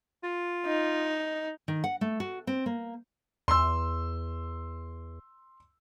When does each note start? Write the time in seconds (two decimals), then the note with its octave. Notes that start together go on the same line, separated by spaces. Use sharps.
0.23 F4
0.66 D#4
1.68 D#3
1.84 F#5
2.01 A3
2.20 F#4
2.47 C4
2.66 A#3
3.48 E2 C6 E6